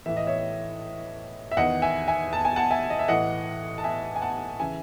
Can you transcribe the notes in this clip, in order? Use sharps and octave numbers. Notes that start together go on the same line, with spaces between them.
A2 E3 E5
D#5
C#5 E5
E5
E2 D#3 D#5 F#5
E5 G#5
E5 G#5
A5
G#5
F#5 A5
E5 G#5
D#5
E5
A2 E3 D#5 F#5
A5
E5 G#5
G#5
F#5 A5
C#3 E3 E5 G#5